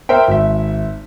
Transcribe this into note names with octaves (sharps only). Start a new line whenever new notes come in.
A#4 C5 E5 G5
G#1 E5